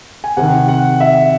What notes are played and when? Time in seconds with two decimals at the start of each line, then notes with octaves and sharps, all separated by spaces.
0.24 G#5
0.37 C3 D#3 F#5
0.68 F#5
1.00 E5